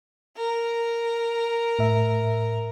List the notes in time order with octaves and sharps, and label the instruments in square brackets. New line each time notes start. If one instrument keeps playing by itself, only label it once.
[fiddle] A#4
[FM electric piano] A2 E5